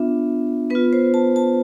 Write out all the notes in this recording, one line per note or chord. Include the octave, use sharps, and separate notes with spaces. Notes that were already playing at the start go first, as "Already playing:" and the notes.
Already playing: B3 D4 F4 E5
B3 B4
F4
C5
A5
A5